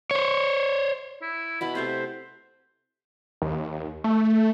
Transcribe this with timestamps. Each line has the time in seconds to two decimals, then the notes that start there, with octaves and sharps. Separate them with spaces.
0.11 C5 C#5
1.22 E4
1.61 B2 B3 E4 B5
1.75 C3 A3 C5 E5
3.42 D#2
4.04 A3